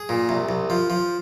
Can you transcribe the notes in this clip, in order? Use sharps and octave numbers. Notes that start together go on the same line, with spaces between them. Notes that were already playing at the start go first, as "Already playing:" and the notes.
Already playing: G#4
A#2
C2
C2
F3
F3